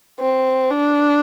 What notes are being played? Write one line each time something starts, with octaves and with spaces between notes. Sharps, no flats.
C4
D4